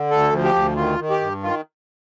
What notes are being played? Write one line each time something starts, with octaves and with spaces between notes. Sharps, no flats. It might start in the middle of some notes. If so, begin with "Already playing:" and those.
Already playing: D3
D2 A4
F3
G4
D2
D#3 F4
D#3
G4
G2
D#3 F4